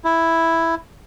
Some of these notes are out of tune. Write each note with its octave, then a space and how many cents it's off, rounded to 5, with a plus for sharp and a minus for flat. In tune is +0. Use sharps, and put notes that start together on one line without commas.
E4 +0